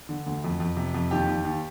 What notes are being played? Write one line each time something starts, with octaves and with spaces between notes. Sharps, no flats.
D3
D2
F2
F2
C3
F2
D#2 G4
D#2
D#2